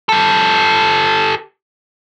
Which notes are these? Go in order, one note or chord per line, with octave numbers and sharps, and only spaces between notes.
G4 A4